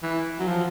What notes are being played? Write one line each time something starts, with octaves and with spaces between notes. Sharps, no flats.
E3
F#3
F3